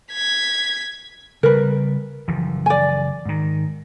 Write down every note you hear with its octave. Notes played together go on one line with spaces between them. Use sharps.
G#6 B6
C#3 G3 A#4 B4
F#1 E3 F3
D5 G#5
G#2 D#3